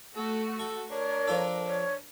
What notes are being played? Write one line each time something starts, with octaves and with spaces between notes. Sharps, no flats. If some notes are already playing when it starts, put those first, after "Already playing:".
A3 F#4 A4
A4 C#6
D4 A#4 C#5
F3 F4 A4
C#5